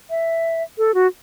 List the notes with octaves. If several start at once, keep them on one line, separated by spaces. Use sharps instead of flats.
E5
A4
F#4